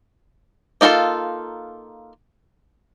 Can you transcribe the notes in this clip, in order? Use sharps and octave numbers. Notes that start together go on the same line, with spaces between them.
A#3 D#4 F4 F#4 A4